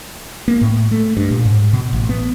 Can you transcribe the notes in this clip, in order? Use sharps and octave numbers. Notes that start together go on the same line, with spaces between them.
A#3
A2
A3
G2
A#2
G#2
B2
A1
B3